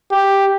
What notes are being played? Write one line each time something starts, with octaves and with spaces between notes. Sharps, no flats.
G4